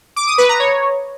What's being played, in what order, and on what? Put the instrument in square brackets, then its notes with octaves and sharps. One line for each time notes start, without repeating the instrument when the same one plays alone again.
[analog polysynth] D6
D#6
B4
A#5
C#5